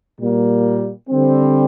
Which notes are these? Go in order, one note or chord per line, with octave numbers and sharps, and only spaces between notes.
A#2 G3 A#3
D3 G3 C4